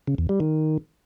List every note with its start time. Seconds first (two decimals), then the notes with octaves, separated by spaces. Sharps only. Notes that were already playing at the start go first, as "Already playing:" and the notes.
0.07 C#3
0.18 E2
0.29 G3
0.40 D#3